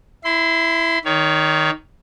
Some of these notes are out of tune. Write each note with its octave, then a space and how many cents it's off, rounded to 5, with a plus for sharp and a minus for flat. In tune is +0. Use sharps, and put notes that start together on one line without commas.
E4 +0 C6 -35
D#3 +0 C#5 +30